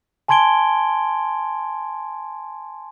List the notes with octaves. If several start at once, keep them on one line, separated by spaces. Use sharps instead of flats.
G#5 A5 C6 G#6 D7 G7